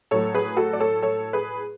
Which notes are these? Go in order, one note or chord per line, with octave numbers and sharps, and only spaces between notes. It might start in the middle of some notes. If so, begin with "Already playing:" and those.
A2 F#3 A4 C#5
G#4 B4
F#4 A4
D5
A4 C#5
A4 C#5
G#4 B4